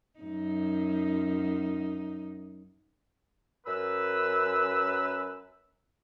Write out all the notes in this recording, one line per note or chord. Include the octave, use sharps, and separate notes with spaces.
F#2 D#4
F#2 B4 E6